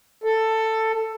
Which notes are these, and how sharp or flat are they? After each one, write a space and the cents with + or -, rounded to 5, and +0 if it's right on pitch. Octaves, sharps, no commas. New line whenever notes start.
A4 +10